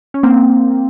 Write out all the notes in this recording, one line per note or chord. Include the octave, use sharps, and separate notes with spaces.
C#4
A#3 C4